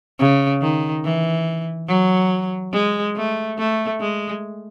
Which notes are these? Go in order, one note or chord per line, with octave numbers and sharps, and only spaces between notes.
C#3
D#3
E3
F#3
G#3
A3
A3
G#3